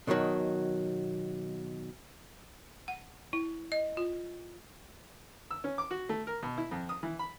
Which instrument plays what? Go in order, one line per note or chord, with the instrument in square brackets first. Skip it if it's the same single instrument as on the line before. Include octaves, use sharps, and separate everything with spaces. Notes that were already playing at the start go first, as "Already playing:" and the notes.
[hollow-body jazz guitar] B2 D3 D#3 F#3
[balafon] F#5
E4
D#5
F4
[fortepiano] E6
C#4
D6
F#4
A3
A#4
B2
E4
F2
D#6
E3
B5